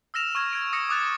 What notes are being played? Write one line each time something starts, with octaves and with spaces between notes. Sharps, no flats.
E6 F6 A#6 E7 F7
C#6 F6 G#6
G#6 D7
D#6 A#6 C#7
D6 D#6 F#6 A6